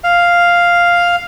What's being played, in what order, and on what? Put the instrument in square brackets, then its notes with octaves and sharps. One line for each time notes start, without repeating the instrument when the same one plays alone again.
[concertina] F5